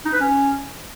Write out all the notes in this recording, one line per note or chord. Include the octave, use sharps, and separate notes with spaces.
D#4
B4
C#4